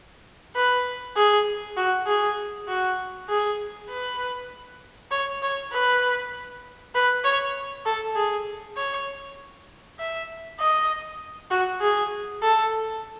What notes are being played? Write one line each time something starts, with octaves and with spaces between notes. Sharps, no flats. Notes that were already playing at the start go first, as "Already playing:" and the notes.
B4
G#4
F#4
G#4
F#4
G#4
B4
C#5
C#5
B4
B4
C#5
A4
G#4
C#5
E5
D#5
F#4
G#4
A4